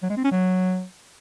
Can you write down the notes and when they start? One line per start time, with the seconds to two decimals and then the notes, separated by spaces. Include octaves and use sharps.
0.03 F#3
0.10 G#3
0.17 C4
0.24 C#4
0.31 F#3